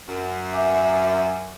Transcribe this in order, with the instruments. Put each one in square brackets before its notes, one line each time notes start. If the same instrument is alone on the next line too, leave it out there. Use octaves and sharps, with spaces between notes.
[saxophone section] F#2
[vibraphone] E5 G#5 D6